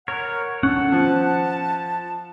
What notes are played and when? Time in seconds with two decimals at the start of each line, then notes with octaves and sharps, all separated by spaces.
0.08 A#4 C#5 F#5
0.63 C#4 A4 F#5
0.92 F3 A5